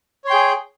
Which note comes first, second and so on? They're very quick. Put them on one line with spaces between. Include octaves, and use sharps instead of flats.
C#5 C6 G5 G#4